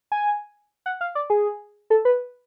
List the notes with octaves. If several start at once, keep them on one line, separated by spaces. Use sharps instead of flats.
G#5
F#5
F5
D5
G#4
A4
B4